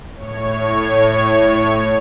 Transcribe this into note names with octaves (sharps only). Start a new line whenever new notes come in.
A2 C#5